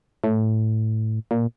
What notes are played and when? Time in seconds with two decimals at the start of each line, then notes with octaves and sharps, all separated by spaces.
0.24 A2
1.31 A#2